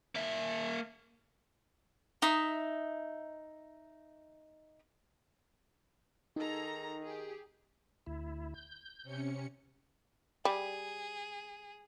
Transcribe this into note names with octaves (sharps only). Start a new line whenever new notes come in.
A#3 E5
D#4 E5 D#6
D#3 D#4 G#4 A4 A#5
G4 G#4
D2 E4
G6
C3 C#4 C#7
G3 G#4